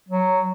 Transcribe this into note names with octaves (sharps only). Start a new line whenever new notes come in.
F#3